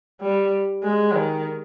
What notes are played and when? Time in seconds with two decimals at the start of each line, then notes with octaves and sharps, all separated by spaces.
0.21 G3
0.84 G#3
1.15 D#3